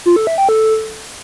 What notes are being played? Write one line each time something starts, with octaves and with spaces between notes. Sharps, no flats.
F4
A4
E5
G5
A4